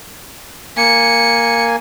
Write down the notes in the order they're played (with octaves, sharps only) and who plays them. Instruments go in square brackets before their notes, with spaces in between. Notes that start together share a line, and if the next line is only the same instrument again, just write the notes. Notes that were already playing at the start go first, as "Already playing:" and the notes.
[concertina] A#3 G#5 [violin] C#7